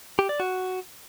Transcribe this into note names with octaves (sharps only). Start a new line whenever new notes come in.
G4
D5
F#4